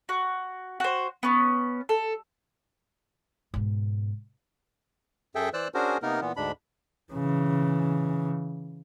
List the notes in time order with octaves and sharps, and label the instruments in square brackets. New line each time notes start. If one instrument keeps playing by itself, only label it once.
[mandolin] F#4
F#4 C5
B3 C#4
A4
[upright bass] G#2 B2
[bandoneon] F#2 G#4 A4 E5 G5
E3 C5 D5 E6 F#6
C#4 D4 F#4 G#4 A#4 C5
C3 A#3 B3 D#4 A#4
A#2 E3 B3
D2 G#2 D4 B5
[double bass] C#3 E3